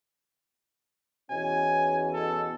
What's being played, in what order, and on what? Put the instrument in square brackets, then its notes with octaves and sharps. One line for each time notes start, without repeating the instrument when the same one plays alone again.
[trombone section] E2 B2 C#4 [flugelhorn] G#5
[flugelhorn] A4